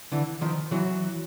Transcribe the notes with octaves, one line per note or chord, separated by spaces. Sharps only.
D3 E3
D#3 F3
E3 F#3